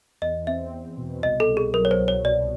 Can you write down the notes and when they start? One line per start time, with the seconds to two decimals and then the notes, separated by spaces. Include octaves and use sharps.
0.22 E2 D#5
0.47 C4 E5
0.73 E2
0.98 B2
1.23 C2 D#5
1.40 A4
1.49 C2
1.57 G#4
1.74 F#3 A#4
1.85 C#5
1.91 C5
1.99 C2
2.08 C#5
2.25 B2 D5